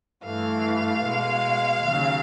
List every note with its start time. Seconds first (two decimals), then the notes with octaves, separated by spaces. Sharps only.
0.24 G2 E3 A3 F5
1.04 B2 G#3
1.85 D#2 C#3 F#3